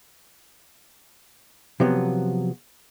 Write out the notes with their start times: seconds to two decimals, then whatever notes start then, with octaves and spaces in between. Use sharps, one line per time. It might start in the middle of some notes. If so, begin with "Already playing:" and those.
1.80 C3 F3 F#3 B3